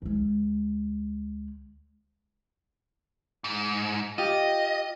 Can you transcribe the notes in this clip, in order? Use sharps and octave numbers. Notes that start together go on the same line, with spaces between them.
D2 G#3
G#2
F4 G4 D#5